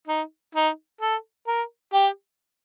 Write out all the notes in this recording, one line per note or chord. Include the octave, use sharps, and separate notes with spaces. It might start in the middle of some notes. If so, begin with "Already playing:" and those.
D#4
D#4
A4
A#4
G4